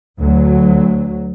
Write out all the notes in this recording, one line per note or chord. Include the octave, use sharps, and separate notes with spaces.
D2 F#3